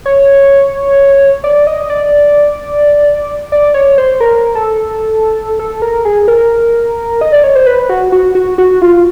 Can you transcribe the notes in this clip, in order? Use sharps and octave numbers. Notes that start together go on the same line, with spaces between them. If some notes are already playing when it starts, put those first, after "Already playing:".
C#5
D5
D#5
D5
D5
C#5
C5
A#4
A4
A4
A#4
G#4
A#4
D#5
D5
C#5
C5
B4
F#4
F#4
F#4
F#4
F4